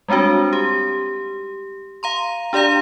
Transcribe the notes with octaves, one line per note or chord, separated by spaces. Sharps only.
G3 G#3 C4 D4 F#4
G4
F5 A#5 C6
D4 G4 D5 F5 A#5